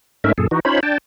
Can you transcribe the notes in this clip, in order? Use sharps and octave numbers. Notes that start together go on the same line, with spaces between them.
G#2 A3 C#4 D#4 A#4 E5
F#2 A#2 G#4 A4
E3 D#4 F#4
C#4 D#4 F4 C5 C#5 B5
D4 G5 A5